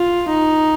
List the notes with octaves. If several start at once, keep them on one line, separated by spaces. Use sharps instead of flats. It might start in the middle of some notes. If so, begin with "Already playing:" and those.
Already playing: F4
D#4